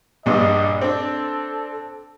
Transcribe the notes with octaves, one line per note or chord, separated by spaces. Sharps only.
A#1 G2 D#5
C4 D4 A4